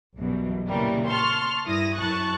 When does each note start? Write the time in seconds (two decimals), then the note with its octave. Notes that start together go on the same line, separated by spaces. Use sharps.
0.16 B1 F#2 B2 E3 G3
0.68 A#2 C#3 E3 G3 A#4
1.06 A5 C6 C#6 F6
1.66 G2 E4 D#6 A#6
1.97 F#2 E4 A5 C#6 F#6